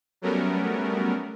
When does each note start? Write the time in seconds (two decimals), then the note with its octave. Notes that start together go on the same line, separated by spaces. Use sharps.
0.22 F#3 G3 A3 B3 C#4 A#4